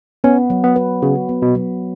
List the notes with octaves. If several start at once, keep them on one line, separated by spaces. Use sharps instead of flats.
B3 C#4
F#3
B3
B4
C#3 F#4
B3
B2
F#3